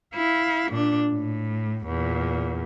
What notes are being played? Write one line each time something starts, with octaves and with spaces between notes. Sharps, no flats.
E4 F5
A#2 D4
A2
E2 A#2